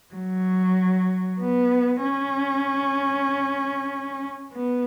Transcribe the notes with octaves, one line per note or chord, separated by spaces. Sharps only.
F#3
B3
C#4
B3